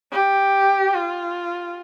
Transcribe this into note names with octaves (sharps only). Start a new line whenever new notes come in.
G4
F4